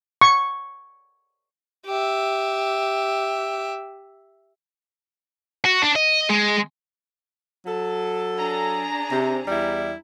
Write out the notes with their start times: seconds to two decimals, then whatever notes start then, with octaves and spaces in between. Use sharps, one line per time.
0.21 C#6
1.86 G4 E5
5.65 F#4
5.82 D4
5.96 D#5
6.29 G#3
7.66 F#3 A4
8.38 D4 G#4 A#5
9.12 C3
9.48 E2 G3 E4